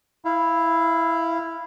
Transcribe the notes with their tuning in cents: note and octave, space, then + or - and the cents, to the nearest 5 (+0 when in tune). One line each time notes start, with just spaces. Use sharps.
E4 +0 F5 -25